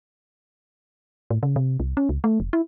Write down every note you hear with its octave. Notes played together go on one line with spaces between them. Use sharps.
A2
C#3
C3
C2
C#4
C#2
A3
F1
E4